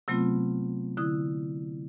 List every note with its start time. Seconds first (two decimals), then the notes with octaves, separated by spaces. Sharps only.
0.08 C3 F#3 A3 B3 C4 F4
0.97 D3 E4 D#6